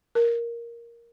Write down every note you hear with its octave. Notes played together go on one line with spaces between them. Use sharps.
A#4